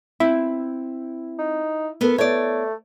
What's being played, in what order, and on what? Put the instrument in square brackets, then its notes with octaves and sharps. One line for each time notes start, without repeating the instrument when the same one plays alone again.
[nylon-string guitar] C4 [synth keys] E4
[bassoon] D#4
[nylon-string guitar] B3 A4 A#4
[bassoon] A3 [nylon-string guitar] C#5 D5